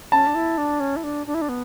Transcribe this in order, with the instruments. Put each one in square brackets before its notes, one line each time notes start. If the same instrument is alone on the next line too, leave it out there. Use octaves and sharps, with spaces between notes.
[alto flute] C#4 [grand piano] A5
[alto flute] D4
E4
D4
C#4
E4
D4
D4
E4
D4
B3